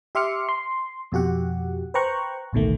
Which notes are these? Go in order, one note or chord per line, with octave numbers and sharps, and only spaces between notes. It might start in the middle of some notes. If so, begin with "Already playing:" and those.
G4 E5 C6 D6 F6 C#7
C6
F2 B2 F#4 G4 F#5
B4 C5 G5 A#5 C#6 F#6
A1 D2 B2 D#3 A3